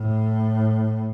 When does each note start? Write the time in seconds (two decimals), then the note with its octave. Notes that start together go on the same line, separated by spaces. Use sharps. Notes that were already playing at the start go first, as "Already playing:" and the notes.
Already playing: A2